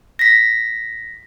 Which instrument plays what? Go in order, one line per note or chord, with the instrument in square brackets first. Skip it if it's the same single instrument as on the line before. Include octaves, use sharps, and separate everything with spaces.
[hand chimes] A#6 B6